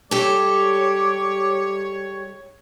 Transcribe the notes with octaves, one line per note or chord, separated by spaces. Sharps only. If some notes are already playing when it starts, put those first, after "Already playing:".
G3 G#3 G4 A4 C#5 D6